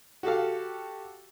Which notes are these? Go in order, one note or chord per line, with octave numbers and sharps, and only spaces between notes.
F#4 G4 A4 F5